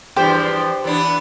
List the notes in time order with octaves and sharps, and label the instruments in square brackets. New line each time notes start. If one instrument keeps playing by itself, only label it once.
[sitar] E2 G2 F3 [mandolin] G4 C5
[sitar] E3 B3 D4